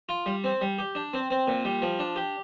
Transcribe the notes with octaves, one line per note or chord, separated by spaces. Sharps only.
F4
G3
C4
G3
G4
D4
C4
C4
A#2
G3
F3
D4
G4